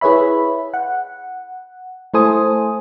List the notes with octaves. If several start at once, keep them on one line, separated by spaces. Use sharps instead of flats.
E4 G#4 B4 C#5 E5 B5
F#5
A3 E4 A4 C5 G#5 D#6